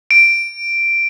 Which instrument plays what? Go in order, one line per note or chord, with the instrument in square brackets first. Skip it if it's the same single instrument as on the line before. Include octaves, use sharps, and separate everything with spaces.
[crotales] D7